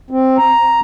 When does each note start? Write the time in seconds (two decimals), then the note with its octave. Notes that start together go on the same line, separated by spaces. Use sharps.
0.11 C4
0.38 A#5